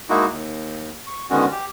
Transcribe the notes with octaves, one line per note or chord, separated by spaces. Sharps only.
G#3 A#3 D#4 E4 F#4
D#2
C#6
D3 D#3 G#3 B3 C#4 F#4
G4